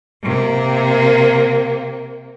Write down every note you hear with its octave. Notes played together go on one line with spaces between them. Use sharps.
C3 A#3